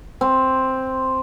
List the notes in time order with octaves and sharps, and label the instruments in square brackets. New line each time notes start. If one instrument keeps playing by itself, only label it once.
[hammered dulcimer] C4